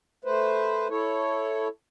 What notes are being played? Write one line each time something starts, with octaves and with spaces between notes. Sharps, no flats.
A3 B4 C5
E4 A4 C#5